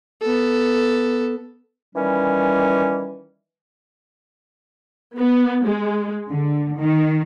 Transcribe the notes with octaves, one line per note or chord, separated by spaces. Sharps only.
B3 A4
D#3 E3 G3 C#4
B3
G#3
D3
D#3